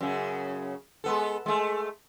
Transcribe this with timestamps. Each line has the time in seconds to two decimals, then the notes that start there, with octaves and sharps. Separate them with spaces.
0.01 F#2 C#3
1.04 G#3 B3 A4
1.46 G#3 A3